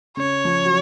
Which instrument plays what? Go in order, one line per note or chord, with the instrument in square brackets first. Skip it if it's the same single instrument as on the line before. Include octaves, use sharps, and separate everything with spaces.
[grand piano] C#3 [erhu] C#5
[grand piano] F3
F#3